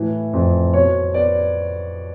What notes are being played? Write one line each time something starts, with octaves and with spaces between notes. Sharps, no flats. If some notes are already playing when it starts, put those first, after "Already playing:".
Already playing: A2 E3
F2
B2 C#5
B3 D5